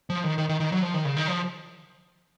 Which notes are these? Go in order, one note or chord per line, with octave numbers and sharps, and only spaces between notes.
F3
D#3
D#3
D#3
D#3
F#3
F3
D#3
C#3
D#3
F3